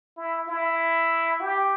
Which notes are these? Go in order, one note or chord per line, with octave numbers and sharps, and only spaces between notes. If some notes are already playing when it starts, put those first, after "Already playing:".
E4
E4
G4